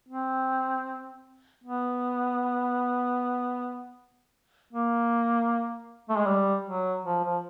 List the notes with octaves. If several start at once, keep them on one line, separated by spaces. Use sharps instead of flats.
C4
B3
A#3
A3
G#3
G3
F#3
F3
F3